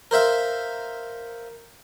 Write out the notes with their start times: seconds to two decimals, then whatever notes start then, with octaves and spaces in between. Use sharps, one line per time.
0.11 A#4 C5 E5 F5